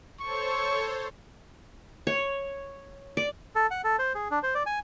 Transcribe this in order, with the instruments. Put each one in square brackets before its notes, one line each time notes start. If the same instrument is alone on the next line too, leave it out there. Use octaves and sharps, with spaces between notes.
[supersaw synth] A4 C5 C#5 [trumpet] C#6
[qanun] C#5
D5
[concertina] A4
F#5
A4
C5
G#4
D4
C5
D5
G#5